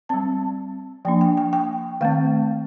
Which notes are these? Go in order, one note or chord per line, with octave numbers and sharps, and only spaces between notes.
G3 C4 A5
F3 A#3 D4 G5
G5
G5
G5
D#3 A3 C4 F5